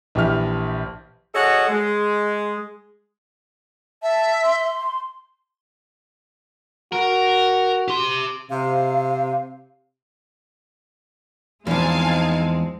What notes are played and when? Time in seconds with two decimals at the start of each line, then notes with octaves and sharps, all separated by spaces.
0.15 A#1 E3 G4 E5 F6
1.34 F#4 G#4 A4 C#5 D#5 F#5
1.68 G#3
4.02 E5 A5
4.44 C6
6.93 F#4 A#4
7.88 G4 C6
8.51 C3 F5
11.67 E2 F3 G#3 C4 D#4 F5 G#5 A5